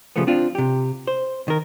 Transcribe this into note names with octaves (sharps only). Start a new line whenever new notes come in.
C#3 F3 G3 A3 B3
C4 D4 F4
C3 G4
C5
D#3 A#4